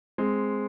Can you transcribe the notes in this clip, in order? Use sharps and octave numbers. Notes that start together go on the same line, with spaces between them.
G#3 C4